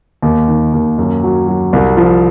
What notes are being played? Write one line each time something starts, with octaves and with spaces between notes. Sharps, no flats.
D#2
D#3
D#2
F#2
F#3
F#3
C2
F3